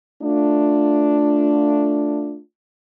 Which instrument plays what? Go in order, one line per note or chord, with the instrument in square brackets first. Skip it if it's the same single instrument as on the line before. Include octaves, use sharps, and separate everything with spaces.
[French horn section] A3 D4 F4